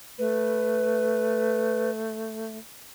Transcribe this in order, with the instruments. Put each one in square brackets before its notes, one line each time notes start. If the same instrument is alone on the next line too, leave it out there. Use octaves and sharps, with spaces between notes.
[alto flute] A3 [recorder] B4